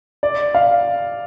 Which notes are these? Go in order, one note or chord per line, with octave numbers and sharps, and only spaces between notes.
D5
F5